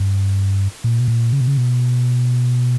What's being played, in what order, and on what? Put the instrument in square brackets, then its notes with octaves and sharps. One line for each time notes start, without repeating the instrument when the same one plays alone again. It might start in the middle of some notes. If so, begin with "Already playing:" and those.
Already playing: [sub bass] G2
A#2
B2
A#2
C#3
B2
C#3
B2